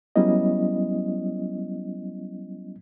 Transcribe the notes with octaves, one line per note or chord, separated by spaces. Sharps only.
F#3 G3 B3 C#4 E4 D#5